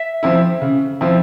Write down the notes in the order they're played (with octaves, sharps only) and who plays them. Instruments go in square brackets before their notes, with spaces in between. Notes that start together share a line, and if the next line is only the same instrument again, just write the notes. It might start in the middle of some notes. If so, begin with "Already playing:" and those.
Already playing: [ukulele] E5
[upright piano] F3 C4 E4
C#3
F3 C4 E4